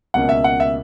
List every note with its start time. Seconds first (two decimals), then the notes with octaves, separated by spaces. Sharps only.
0.14 C#2 B2 A#3 C#4 F#5
0.29 E5
0.44 F#5
0.60 E5